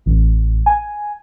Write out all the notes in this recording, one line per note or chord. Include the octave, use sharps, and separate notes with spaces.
A1
G#5